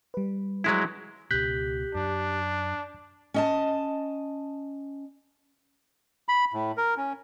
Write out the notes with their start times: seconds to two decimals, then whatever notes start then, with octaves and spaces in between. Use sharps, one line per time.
0.14 G3 B4
0.64 F#3 G#3 E4
1.31 C#2 B2 G4 F#6 G6 B6
1.95 F#2 D4
3.34 C#4 D#5 A5
6.29 B5
6.53 A2
6.77 A#4
6.97 C#4